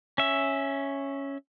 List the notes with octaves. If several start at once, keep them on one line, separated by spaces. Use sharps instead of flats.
C#4 E5